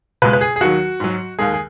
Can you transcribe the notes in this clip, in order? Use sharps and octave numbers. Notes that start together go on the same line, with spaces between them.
C#2 B2 G#3 B4
B4
G#4
G#4
D#2 D#3 F#3 F#4
G#2 F#3
D#2 D#3 G#3 G#4
G#4